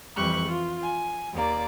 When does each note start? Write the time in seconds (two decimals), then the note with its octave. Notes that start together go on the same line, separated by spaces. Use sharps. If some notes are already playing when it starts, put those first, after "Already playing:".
0.16 F2 E3 G3 C#6 F#6
0.48 F4
0.83 G#5
1.34 D#2 A#3 D5